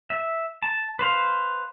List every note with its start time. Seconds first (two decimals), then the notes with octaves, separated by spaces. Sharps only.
0.10 E5
0.62 A5
0.99 B4 C5 F5